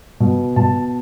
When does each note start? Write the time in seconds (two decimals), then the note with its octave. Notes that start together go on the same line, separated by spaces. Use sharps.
0.20 B2
0.56 B2 A5